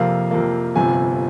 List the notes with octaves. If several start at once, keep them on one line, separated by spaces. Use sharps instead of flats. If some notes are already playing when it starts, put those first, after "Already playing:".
Already playing: F2 C3 F3 A#3 F5
F2 C3 F3 A#3
G1 F2 C3 F3 G#5